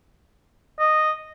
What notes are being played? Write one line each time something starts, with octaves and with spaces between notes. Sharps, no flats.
D#5